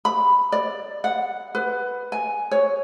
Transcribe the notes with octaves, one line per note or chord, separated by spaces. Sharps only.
B5
D5
F#5
B4
G#5
C#5